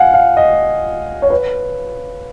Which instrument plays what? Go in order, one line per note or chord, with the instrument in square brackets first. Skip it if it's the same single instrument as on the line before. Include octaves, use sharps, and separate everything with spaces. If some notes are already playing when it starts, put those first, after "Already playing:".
Already playing: [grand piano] F5 F#5 G#5
F5
D#5
C#5
B4